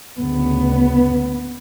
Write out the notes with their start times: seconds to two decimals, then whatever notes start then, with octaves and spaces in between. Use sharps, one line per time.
0.18 D2 C#3 B3